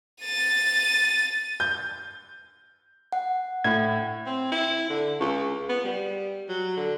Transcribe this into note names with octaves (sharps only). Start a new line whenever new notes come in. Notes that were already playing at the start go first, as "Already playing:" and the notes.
A6 D#7
G6
F#5
A2 G#6
C4
E4
D3
C#2
B3
G3
F#3
D3